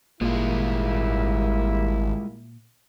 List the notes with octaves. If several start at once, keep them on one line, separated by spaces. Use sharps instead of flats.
G#1 A#2 G3 G#3 A#3 E4 F4